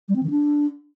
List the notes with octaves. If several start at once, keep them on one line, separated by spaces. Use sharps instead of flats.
G3
C4
D#3
D4